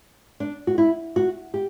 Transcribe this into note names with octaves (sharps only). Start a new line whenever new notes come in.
D4
F#4
E4
F#4
G4